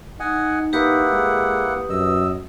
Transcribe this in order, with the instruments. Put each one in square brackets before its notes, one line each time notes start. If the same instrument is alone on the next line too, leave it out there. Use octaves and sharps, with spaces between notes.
[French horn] D#4 [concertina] D#5 F#5 G#5
[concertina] A#3 E4 F#5 [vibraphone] G4 B4 D#6
[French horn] G#3
[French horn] F#2 [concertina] D#5 E6